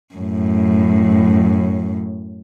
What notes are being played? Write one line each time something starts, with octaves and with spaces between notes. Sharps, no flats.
F#2 A2